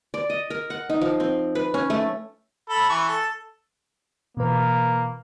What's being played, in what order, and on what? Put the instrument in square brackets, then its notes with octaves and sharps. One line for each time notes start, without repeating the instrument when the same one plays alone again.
[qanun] D5
D#5
A#4
F#5
D#4
F3
C4
B4
C#4
A3
[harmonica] A4 B5
E3 C#6
A4
[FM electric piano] B2 E3 B4 [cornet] A#3